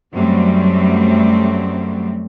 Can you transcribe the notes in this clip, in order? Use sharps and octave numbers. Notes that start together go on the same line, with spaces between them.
F#2 F#3 G3 A3 C4